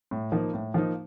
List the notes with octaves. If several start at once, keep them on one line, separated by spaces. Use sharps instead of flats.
A2
F3 A#3 D#4
A2
F3 A#3 D#4